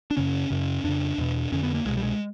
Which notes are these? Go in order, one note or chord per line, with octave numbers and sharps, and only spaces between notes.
D4
F#2 C#3 C#4
F#2 C#3
F2 C#3 D4
E2 B2
F2 D3 C#4
B3
A#3
C2 B2 G#3
G3
G#3